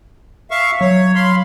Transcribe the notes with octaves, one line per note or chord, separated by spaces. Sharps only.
E5 F5 C#6
F#3 C#5
F5 B5 C6